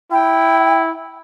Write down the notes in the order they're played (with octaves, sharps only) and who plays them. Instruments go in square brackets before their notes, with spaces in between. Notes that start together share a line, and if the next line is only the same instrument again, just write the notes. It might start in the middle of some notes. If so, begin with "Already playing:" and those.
[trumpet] E4 [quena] G5